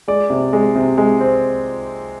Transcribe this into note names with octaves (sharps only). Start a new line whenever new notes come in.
G#3 D5
C3
G#3
C3
G#3
C4